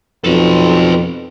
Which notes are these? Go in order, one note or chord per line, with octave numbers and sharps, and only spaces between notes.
B1 F2 A4 B4